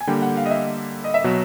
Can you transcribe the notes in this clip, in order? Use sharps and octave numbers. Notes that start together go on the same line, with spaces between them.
G#5
D3 G3 A#3 G5
F#5
F5
D#5
E5
D#5
E5
B2 F#3